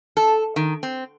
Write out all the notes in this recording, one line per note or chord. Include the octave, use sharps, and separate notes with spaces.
A4
D#3
C4